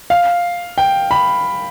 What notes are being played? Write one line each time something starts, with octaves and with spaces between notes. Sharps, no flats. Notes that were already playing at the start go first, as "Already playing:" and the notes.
F5
G5
B5